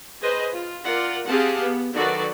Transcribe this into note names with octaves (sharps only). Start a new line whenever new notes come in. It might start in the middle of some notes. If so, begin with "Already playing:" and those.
G#4 B4 C5 D#5
F4
F4 A#4 D5 F#5
C4 G4 G#4 F5 F#5 A5
B3
D#3 F#3 F#4 A4 B4 D5